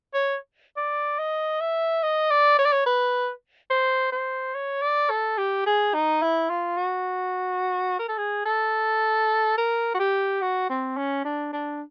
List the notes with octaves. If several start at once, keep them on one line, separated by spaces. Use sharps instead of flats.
C#5
D5
D#5
E5
D#5
D5
C#5
D5
C#5
B4
C5
C5
C#5
D5
A4
G4
G#4
D#4
E4
F4
F#4
A#4
A4
G#4
A4
A#4
F#4
G4
F#4
C4
C#4
D4
D4